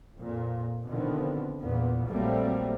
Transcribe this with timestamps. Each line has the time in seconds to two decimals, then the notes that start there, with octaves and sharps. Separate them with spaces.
0.15 F2 A#2
0.86 B2 D3 D#3 F3 B3 C4
1.61 E2 A#2 B3
2.09 A#1 F#3 G3 A3 A#3 C4